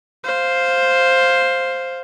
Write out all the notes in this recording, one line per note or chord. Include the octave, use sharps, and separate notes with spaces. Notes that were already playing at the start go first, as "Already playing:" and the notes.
C5 F5